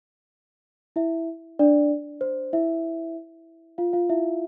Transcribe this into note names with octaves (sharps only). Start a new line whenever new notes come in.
E4 E5
D4 D5
C5
E4 E5
F4 F5
F4 F5
E4 E5